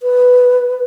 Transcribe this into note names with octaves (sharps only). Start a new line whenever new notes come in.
B4